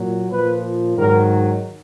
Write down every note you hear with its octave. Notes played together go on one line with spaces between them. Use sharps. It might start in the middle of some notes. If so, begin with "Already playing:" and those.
Already playing: A#2 F#3
A#2 F3 B4
G#2 D#3 F#3 A#4